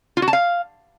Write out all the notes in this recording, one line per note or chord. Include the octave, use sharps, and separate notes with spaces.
F4
F#4
A5
F5